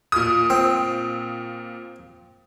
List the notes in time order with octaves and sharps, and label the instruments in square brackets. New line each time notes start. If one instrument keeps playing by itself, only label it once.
[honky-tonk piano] A#2 D#6
[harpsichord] C4